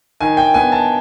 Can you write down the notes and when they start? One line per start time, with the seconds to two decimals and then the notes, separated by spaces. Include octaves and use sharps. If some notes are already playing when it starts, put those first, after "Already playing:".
0.21 D#3 G#5
0.37 G5
0.54 B3 G#5
0.72 A5